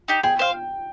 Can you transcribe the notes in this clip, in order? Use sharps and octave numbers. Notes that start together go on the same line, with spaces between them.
D#4 G4
G#4 G5
C5 F5